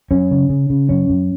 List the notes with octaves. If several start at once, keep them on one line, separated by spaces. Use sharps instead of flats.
F#2 C#4
C#3
C#3
C#3
F#2 C#4
F#2